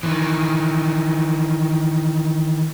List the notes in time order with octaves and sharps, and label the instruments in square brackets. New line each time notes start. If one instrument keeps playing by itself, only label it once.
[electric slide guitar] D#3 E3